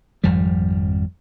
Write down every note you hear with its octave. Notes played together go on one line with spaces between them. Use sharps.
G#1 F2 F3 G3